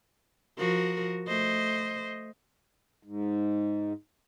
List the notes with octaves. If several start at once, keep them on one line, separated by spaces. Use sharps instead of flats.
F3 F#4 A#4
A3 C5 D#5
G#2